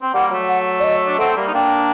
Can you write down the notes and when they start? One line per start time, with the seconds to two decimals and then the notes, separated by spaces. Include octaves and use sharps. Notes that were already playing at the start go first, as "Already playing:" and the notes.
0.02 C4
0.14 G3 A#3 F#5
0.31 F#3 A3
0.48 F#5
0.80 D5
0.84 D#5
1.07 D4
1.19 A3 C4 F#5
1.36 G3 A#3
1.48 D#4
1.54 A#3 D4 G5